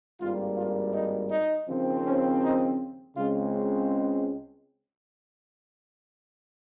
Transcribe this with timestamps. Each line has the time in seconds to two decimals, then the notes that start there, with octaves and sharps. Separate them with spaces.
0.20 G#1 G2 G3 A#3 F4
0.56 F4
0.94 D#4
1.31 D#4
1.68 D#2 C#3 F3 C4
2.05 C#4
2.43 D#4
3.16 C#2 C#3 G#3 C4 F4